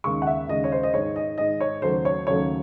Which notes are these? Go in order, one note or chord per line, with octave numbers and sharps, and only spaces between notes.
D#2 C#3 G#3 C#6
F#5
E5
D#2 C#3 G#3 D#5
C#5
C5
D#5
G#2 D#3 G#3 C#5
D#5
G#2 D#3 G#3 D#5
C#5
D#2 C#3 F#3 A3 C5
C#5
D#2 C#3 F#3 A3 C#5